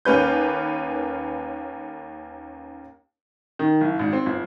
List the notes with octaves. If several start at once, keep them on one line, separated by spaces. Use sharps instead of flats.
D#2 A#3 C#4 B4 G6
D#3
F#1
G#1
C4
G1